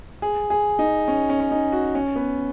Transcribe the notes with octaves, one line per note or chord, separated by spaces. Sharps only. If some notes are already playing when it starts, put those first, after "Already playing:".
G#4
G#4
D#4
C#4
C#4
C#4
D#4
F#4
C#4
B3